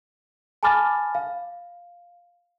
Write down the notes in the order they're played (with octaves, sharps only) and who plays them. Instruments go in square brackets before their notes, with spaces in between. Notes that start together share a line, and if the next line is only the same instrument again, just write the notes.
[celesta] G#5 A5 B5 D6 F6 A6
F5